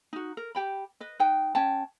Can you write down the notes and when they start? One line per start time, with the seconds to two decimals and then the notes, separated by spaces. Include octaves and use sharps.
0.13 D#4 F#4
0.37 A#4
0.55 G4 G5 B5
1.00 B4 D#5
1.20 D#4 B4 G5
1.55 C#4 G5 A5